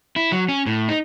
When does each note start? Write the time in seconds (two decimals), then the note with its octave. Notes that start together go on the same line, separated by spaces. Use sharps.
0.16 E4
0.32 F#3
0.49 C#4
0.66 A2
0.89 D#4